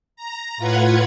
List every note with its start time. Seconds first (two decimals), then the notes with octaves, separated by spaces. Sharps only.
0.16 A#5
0.57 A2 F4 B4 F#5 G#6